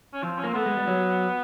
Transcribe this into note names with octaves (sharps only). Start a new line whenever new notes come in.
C#4
F3 C4
C#4
A#3 C4
A3 B3
G#3
G3
F#3